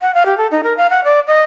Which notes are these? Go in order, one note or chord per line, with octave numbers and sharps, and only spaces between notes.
F#5
F5
G4
A4
D#4
A#4
F5
F#5
D5
D#5